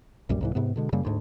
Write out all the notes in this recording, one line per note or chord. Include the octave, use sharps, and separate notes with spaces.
B1 F#2 A#2 G3
C2 G#2 E3
G#2 C3 B3
B2 D3 G#3
F#2 C#3 G3 A#3
D2 G#2